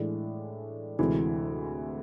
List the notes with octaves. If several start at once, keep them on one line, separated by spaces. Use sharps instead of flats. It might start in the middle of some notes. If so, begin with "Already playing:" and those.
Already playing: A2 E3 G#3 D4
D2 C3 E3 G#3